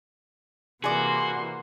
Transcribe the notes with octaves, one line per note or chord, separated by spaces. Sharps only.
C3 E3 A#3 F#4 G#4 D5 C6